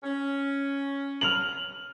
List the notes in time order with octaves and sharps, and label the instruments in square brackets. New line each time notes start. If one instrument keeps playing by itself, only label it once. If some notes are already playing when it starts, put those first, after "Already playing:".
[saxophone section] C#4
[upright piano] F6 F7 F#7